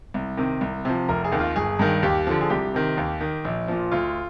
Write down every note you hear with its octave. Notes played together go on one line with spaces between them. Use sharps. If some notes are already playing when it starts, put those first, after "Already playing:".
C2
C3 D#3
C2
C3 F3
F1 A#4
G#4
D#2 D#3
F4
G1 G#4
G2 D#3
D#2 G4
D3 F3
G#4
C2 G4
C3 D#3
D#2
D#3
A#1
A#2 F3
D2 F4